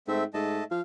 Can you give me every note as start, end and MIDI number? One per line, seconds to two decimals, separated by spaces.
0.08 0.25 44
0.08 0.24 57
0.08 0.24 60
0.08 0.24 76
0.34 0.62 44
0.34 0.64 57
0.34 0.64 75
0.34 0.64 81
0.71 0.81 53
0.71 0.81 77